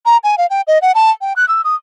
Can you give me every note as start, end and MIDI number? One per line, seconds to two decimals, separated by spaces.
0.06 0.17 82
0.24 0.36 80
0.38 0.46 77
0.50 0.62 79
0.67 0.79 75
0.82 0.92 78
0.95 1.11 81
1.21 1.33 79
1.36 1.47 90
1.48 1.62 88
1.65 1.75 87